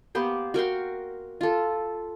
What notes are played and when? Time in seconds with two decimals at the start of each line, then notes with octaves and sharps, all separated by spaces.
0.15 A#3 B3 G4 C5
0.54 F#4 A#4 G5 C6
1.41 F4 A4